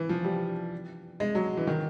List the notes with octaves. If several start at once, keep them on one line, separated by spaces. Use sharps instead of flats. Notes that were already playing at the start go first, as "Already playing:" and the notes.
Already playing: E3
F3
G3
G#3
F#3
E3
D#3